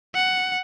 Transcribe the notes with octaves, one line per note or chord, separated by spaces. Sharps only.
F#5